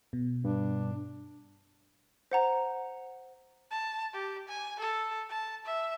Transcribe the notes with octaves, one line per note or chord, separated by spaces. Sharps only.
B2
G2 D4
C5 F#5 A#5
A5
G4
G#5
A4
A5
E5